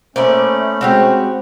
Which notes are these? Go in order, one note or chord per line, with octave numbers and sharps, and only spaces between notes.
A3 A#3 C#4 C5 D5 E5 B5
G#3 C4 F#4 G4